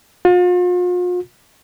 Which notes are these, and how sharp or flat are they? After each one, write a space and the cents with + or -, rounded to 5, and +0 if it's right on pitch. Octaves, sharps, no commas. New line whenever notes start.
F4 +40